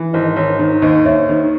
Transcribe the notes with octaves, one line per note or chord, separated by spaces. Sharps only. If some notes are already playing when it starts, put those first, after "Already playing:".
Already playing: E3
G#1 C5 D#5
G#1 C#5
D#3 C5
D#2 C5 D#5
D#2 C#5 E5
D#3 C5